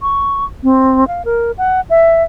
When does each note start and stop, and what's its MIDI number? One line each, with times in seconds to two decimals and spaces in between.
0.02 0.45 85
0.63 1.07 60
1.08 1.22 77
1.25 1.51 70
1.58 1.81 78
1.90 2.23 76